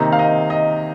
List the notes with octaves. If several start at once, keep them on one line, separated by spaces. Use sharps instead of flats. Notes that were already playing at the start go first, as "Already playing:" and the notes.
Already playing: C3 D#3 A#3 D#4
F5
D#5
D#5